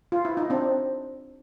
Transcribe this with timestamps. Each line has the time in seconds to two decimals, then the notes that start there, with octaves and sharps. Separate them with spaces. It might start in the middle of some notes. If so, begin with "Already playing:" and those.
0.12 F4
0.25 E4
0.37 D#4
0.50 C4 D4